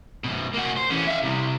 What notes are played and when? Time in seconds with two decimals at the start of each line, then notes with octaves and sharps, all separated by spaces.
0.24 F#2 B2
0.53 A#3 F#4
0.76 C5
0.90 E3 C#4
1.07 E5 F5
1.22 C3 G3